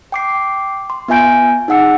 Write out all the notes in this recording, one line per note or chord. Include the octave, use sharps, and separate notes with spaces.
G5 D6 C7
C6
B3 F4 E5 G#5 G6 D7
D#4 G#4 F#5 E6 C#7